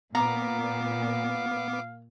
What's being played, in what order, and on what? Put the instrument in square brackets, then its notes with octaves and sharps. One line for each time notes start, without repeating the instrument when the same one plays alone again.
[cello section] A#2 [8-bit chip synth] B3 D6 [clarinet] F5 [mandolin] A#5